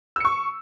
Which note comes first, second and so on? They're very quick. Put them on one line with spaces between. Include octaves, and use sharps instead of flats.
E6 C#7 C#6